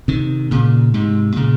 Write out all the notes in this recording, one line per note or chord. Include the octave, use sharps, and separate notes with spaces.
C3 D#3
A#2 C#3
G#2 C3
A#2 C#3